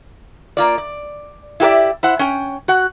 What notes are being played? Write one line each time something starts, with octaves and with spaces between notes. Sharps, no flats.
A#3 F4 D5
D5
E4 F4 G4 A#4 D5 E5
E4 C5 F#5
C#4 G5
F#4 F#5